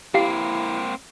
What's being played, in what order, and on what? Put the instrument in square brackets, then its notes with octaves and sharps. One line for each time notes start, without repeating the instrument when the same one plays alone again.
[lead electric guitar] A#3 C4 [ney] E4 [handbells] G4 F5 C7